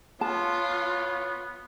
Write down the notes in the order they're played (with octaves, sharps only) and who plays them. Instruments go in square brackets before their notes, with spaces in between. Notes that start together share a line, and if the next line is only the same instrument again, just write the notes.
[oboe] B3 [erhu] F4 [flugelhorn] C#5 [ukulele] A5